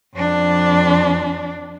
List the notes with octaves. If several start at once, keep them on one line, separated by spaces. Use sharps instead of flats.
F2 D4